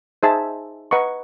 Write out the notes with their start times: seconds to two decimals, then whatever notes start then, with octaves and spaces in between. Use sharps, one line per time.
0.23 D#4 G#4 C5 E5 A5
0.91 B4 D#5 F#5 A#5 C#6